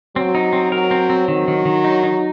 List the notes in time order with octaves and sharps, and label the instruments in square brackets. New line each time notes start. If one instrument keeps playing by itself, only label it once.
[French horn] F#3 [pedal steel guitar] C4
[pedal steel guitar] D#4
C4
[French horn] F#3 [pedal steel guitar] A#4
[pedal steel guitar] C4
C4
[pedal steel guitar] D#3 [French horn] F#3
[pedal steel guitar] D#3
D#3
D#4
D#4